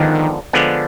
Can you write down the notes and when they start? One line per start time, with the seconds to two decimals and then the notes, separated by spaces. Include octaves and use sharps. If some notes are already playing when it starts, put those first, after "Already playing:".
Already playing: D3 D#3 F3 G#3 B3 D4
0.53 D3 F3 G#3 B3 D4